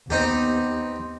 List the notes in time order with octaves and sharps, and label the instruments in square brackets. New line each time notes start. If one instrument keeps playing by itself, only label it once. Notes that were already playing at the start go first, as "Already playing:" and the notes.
[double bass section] D#2 B3 [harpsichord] C4 D#4 G4